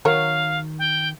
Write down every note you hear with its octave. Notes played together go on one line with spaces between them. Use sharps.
D#3 F#3 A#4 C#5 F5
G5